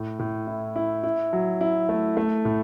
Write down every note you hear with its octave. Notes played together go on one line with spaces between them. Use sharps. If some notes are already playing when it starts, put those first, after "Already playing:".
Already playing: A2
A2
E4
E4
E4
F#3
E4
A3
A3
A2